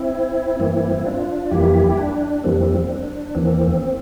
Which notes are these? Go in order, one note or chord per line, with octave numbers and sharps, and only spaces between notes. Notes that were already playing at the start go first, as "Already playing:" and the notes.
Already playing: C4 E4
G2 E3 A#3 C4 E4
D4 F4
F2 E3 G3 A#3 E4 G4
D4
F2 E3 G3 A#3 C4
D4
E2 E3 A#3 C4
C4